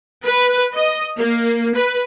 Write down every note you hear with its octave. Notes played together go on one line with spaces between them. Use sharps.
B4
D#5
A#3
B4